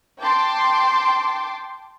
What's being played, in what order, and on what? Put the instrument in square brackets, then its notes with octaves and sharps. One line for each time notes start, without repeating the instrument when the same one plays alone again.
[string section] G5 A5 C6 D6